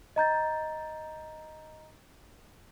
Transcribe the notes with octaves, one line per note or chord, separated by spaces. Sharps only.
D#5 A#5 G6 A6